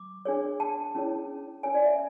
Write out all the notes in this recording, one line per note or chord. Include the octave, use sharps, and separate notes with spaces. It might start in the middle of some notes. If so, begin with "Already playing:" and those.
Already playing: D6
D4 G#4 C#5
A5
C#4 E4 G#4 C#5
C#4 E4 A4 C#5 G#5
D5
E5